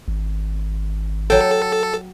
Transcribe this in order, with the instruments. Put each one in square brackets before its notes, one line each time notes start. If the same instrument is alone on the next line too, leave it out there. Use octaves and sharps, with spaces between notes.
[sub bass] G#1
[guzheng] F#3 G5 [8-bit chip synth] A4